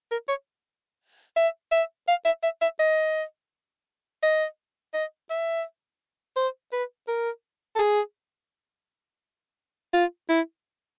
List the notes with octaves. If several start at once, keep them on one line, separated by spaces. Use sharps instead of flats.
A#4
C#5
E5
E5
F5
E5
E5
E5
D#5
D#5
D#5
E5
C5
B4
A#4
A4
G#4
F4
E4